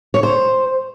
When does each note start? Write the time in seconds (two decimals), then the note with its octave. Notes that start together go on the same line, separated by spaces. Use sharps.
0.14 C#5
0.23 C5